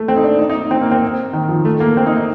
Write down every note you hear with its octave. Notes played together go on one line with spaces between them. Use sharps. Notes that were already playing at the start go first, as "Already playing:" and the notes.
Already playing: A3
C4
D#4
D4
D#4
D#4
C4
A#3
C4
D#3
F3
A3
A#3
C4
D#4
D#4